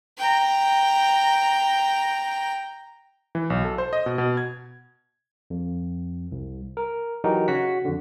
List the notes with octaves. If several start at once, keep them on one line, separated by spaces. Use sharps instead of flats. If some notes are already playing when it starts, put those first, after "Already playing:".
G5 A#5
E3
B1
A4
C5
D#5
B2
B2
G#6
F2
C2
A#4
E3 F#3 D#4 F#4 G4 A#4
C#3 F#4 C#5 F#5 B6
F2 D3